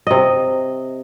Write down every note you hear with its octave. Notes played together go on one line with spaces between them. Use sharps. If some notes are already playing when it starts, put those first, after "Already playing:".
C3 D#5